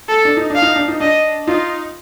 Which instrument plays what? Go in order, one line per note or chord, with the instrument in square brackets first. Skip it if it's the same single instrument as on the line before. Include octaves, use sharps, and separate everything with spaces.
[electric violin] A4
[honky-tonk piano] D4
D#4
D4
[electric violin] F5
[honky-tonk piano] D#4
D4
D#4
[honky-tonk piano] D4 [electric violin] D#5
[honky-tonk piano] D#4 [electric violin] F4